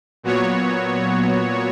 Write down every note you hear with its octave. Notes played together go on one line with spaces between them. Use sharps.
A#2 F#3 B3 F#4 C#5